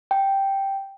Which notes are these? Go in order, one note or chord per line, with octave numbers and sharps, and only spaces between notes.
G5